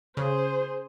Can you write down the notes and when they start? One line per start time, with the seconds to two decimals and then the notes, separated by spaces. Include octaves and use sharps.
0.17 C#3 G#4 C5